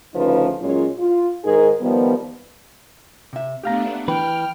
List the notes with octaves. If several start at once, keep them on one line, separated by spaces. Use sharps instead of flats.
D2 C#3 F3 D#4 B4
A#2 F#3 G#3 C#4 F4 C#5
F4
G#2 D#3 D#4 G#4 A#4
D#3 F3 G3 B3
C3 E5
A3 B3 D4 G4 F5 A#5
E3 B4 G5 F6